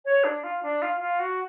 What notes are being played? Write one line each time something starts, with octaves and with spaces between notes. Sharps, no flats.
C#5
D4
F4
D4
F4
F4
F#4